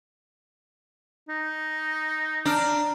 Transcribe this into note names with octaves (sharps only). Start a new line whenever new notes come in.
D#4
D4 A#5 F6